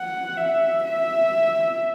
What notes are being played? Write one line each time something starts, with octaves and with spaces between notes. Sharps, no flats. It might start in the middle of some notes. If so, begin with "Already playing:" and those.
Already playing: F#5
E5
E5